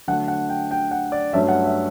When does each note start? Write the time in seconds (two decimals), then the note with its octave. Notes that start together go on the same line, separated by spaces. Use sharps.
0.08 D3 F#3 A3 F#5
0.28 F#5
0.49 G5
0.71 G5
0.91 F#5
1.12 D5
1.33 G2 F#3 A3 C#4 E5
1.48 F#5
1.64 E5